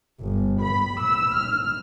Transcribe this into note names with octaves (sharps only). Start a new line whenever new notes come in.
G1
B5
E6
F6